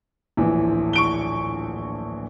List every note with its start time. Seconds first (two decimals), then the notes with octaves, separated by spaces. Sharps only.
0.37 D1 A#1 E3
0.93 C#6 D7 G7